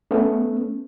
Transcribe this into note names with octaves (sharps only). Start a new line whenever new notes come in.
A3 B3 C#4